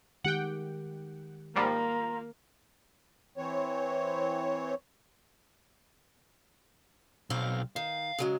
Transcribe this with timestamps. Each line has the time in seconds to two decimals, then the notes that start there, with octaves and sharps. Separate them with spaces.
0.24 D#3 G#3 G4 F#5 G5
1.56 G#2 F3 G3 A#3 F4 A#5
3.37 E3 C4 C#5
7.30 B1 C4 F5
7.76 D#3 F5
8.19 C#3 F#3 G#3